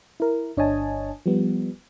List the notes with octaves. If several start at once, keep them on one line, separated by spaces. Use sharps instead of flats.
E4 A#4
G1 D4 C#5 D#5 G#5 A5
F3 G3 B3